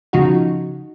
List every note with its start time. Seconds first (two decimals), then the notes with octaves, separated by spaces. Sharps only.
0.13 C#3 F3 D#4 F#4